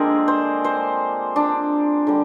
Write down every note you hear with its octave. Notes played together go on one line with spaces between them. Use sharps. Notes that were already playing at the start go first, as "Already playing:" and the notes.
Already playing: D3 F3 G#3 A#3 C4 D4 G#4 A#4
C5
C5
D4
D3 G3